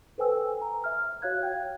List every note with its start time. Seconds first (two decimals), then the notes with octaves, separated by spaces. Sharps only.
0.18 A4 B4 C5 G5 G#5 E6
0.62 A#5
0.84 E5 F6
1.22 F#4 C#5 F5 F#6 G#6
1.43 F5 G5 G6